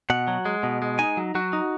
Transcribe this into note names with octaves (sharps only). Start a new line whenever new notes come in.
B2 F#5
F#3
G#3
B2
G#3
D#4 G#5
F#3
F#3 F#4
D#4